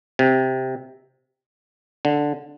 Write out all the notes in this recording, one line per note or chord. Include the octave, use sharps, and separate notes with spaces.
C3
D3